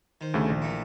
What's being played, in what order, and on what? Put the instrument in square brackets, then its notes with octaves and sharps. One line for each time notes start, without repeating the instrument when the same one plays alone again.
[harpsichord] D#3 C5
[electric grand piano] D2 C#3 A3
A#1
[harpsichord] E3 A3 A#3